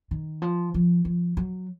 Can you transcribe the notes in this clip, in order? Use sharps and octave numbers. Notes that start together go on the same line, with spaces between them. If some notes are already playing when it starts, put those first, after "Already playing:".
D#3
F3
F3
F3
F#3